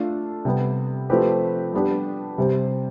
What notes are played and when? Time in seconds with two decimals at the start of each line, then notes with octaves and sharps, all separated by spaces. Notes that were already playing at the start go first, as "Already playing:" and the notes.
Already playing: A3 D4 F4 A4
0.45 C3 G3 B3
1.10 F3 A3 C4 G4 B4
1.74 G3 B3 D4 G4 B4
2.38 C3 G3 C4